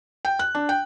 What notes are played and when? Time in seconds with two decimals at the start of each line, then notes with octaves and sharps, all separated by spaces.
0.25 G5
0.39 F#6
0.55 D4
0.69 G5